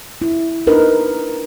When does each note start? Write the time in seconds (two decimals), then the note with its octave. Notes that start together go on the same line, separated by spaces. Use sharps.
0.22 E4
0.67 D4 D#4 A#4 B4